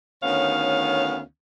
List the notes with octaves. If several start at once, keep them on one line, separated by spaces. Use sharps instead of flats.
D2 D#3 B3 C#4 C#5 F5